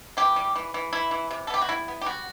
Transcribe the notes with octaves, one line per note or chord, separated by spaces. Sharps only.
E3 G4
G3
E3
E3
E3 E4
E3
C3
A4
B3 G4
F#4
G3 E4
B3
G4
G3 F#4